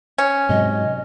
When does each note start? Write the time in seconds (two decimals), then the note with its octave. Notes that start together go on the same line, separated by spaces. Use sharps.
0.18 C#4
0.49 G#2 C3 F#3 D#5